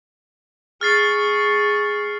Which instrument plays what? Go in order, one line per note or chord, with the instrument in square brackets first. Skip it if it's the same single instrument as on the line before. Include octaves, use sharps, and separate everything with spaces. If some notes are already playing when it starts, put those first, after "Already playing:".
[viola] G#4 C#6 [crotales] F6 A6 C7